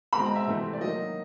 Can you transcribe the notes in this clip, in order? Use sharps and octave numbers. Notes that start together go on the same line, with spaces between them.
B2 G#3 C4 B5
A#5
E5
C3 E3 A3 C4
D5
D#3 F#3 A#3 D#5